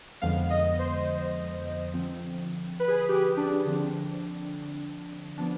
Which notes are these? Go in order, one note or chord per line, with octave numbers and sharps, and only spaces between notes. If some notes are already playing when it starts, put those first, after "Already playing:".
F2 D3 F3 G#3 B3 F5
D#5
C5
D3 F3 C4
B4
G#4
B4
G4
D4
D3 F3 C4
F3 B3 D4